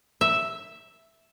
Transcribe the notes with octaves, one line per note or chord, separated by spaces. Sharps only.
E5